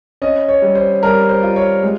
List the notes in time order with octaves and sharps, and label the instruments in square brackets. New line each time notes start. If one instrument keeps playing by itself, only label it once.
[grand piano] C#4 D#5
C#5
G3
C5
G3 A#4
C5
F4
C#5
G#3